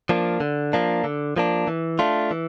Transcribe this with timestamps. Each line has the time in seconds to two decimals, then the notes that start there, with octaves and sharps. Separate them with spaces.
0.09 F3 A#3 D4
0.40 D3
0.73 F3 A#3 D4
1.04 D3
1.36 F3 A#3 D4
1.67 E3
1.99 A3 D4 F4
2.31 E3